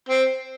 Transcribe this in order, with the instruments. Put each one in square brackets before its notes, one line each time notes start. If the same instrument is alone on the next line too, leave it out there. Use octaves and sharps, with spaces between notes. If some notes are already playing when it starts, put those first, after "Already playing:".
[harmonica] C4